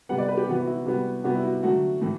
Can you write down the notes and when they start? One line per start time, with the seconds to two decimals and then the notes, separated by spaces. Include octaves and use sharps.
0.09 C3 G3 B3 F#5
0.18 D5
0.28 B4
0.37 G4
0.47 C3 E3 B3 F#4
0.62 F#4
0.67 E4
0.86 C3 G3 B3 F#4
1.24 C3 G3 B3 F#4
1.35 E4
1.43 F#4
1.63 D3 F#3 A3 F#4
2.01 A2 E3 A3